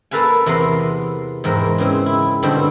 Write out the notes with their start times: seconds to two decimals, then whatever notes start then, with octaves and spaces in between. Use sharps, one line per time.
0.11 A#3 A4 B4 F5 G#5
0.46 E2 C3 B3 A#4 C6
1.44 E2 G#2 C4 A#4
1.78 C#3 E3 C4
2.06 E4
2.43 G2 B2 D3 C4 D4 G5